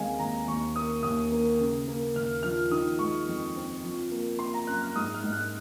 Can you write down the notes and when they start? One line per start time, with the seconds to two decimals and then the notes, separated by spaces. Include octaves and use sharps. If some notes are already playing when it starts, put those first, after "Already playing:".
Already playing: D#2 G#3 C4 F5 G#5
0.19 D#2 A#5
0.48 D#2 C#6
0.76 A#3 D#6
1.03 D#2 D#6
1.32 A#3
1.60 C#3
1.87 A#3
2.16 D#2 F6
2.43 F3 F6
2.71 D#3 D#6
2.99 G#3 C#6
3.28 F2
3.56 C4
3.84 F3
4.11 A#3
4.39 A#3 C6
4.54 A#5
4.67 F#2 F#6
4.82 F6
4.96 G#2 D#6
5.14 F6
5.23 G#2
5.32 F#6